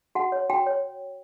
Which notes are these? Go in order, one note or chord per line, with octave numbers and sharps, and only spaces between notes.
F#4 F#5
C#5
F#4 G5
C#5